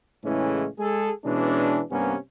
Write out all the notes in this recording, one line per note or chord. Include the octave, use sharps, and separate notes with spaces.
A2 C#3 E3 G#3 A3 C#4
G#3 G#4 A4
B2 E3 G#3 C#4 D4
G2 C3 A#3 B3 C#4